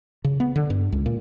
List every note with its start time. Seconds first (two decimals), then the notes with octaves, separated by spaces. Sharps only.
0.24 C#3
0.40 B3
0.56 D3
0.70 G2
0.92 C#2
1.06 A#2